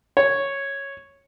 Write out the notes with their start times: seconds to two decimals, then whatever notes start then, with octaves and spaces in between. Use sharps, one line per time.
0.17 C#5